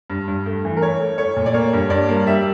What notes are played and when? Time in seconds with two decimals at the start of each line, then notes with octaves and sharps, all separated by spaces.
0.10 G2
0.28 G2
0.46 A3
0.65 E3
0.77 A#4
0.82 A3 C#5
1.00 A3
1.18 A3 C#5
1.36 A#2
1.46 D5
1.54 A#3 C#5
1.73 G2
1.90 G2 D5
2.08 A#3
2.27 G3 E5